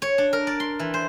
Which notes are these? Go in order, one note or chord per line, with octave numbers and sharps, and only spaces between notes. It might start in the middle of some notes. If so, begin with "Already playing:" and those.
C#5
D4
A#4
D5
C6
E3
C5